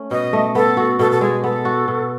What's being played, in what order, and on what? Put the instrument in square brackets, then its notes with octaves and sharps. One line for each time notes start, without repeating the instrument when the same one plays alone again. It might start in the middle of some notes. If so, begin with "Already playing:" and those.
Already playing: [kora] A3 C#4
[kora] B2 [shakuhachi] D#5
[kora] A3
[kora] B3 [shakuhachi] A4
[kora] F#4
[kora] B2 [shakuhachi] A4
[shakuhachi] A4
[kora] G#3 [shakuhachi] G#4
[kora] B3 [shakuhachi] A4
[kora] F#4
B2